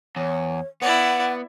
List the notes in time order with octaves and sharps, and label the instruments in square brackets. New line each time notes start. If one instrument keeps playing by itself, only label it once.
[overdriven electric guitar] E2 [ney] C#5
[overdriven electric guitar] B3 [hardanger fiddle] E4 D5 [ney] F#5